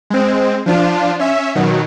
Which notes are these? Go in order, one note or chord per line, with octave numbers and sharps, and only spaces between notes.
G#3 C4
F3 D4 F4
C#4 E5
B2 D#3 F#3